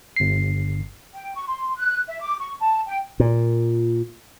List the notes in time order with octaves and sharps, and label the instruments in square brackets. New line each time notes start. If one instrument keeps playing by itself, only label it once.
[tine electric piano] G1 C7
[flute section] G5
C#6
C6
F#6
E5
D6
C#6
A5
G5
[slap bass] A#2